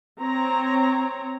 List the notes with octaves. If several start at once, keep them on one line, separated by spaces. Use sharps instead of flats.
C4 C#5 A#5